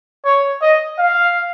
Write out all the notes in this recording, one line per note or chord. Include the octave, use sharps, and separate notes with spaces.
C#5
D#5
F5